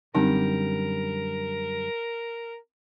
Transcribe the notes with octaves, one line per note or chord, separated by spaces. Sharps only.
F#2 D3 G3 C4 D#4 A#4